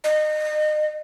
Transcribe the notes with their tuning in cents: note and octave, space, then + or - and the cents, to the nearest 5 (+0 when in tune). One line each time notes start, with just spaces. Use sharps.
D#5 -30